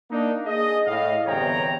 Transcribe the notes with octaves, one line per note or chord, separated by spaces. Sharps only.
A#3 D4 D#4
G#4 D#5
A2 D#5 F5
G1 E2 C3 C#5 G5 A#5